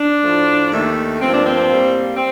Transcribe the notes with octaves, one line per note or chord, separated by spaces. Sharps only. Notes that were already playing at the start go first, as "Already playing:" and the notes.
Already playing: D4
A2 F3 A3
D#2 D#3 A3
G2 F3 A#3 C4
D4
C4
A2 G3 A#3
C4